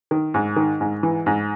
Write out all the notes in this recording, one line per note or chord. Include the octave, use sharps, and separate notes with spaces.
D#3
G#2
D#3
G#2
E3
G#2